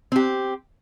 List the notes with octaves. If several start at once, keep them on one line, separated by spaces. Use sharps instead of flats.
C4 G4